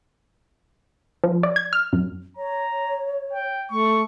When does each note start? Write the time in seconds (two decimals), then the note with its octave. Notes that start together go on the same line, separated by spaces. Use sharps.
1.24 F3
1.43 D5
1.56 G#6
1.73 F6
1.93 F#2
2.37 C#5 A#5
3.33 G5
3.71 A3 C#6